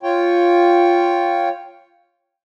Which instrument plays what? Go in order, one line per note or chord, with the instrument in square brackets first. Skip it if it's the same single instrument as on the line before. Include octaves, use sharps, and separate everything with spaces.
[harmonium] F4 C#5 G5